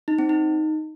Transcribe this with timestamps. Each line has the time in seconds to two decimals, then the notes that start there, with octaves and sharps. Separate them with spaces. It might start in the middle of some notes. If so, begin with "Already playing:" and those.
0.08 D#4
0.19 C4
0.29 D#4